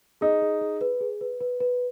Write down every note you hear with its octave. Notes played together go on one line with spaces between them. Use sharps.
D#4 G#4
G#4
G#4
B4
G#4
B4
B4
B4